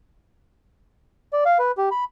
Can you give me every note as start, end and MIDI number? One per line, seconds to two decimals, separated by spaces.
1.33 1.44 74
1.46 1.58 77
1.59 1.72 71
1.78 1.89 67
1.91 2.04 83